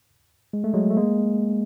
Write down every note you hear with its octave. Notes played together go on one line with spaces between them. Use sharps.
G#3
A3
F#3 G#3
A3
G#3 A#3